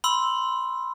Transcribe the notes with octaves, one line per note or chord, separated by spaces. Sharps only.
B5 C6 E6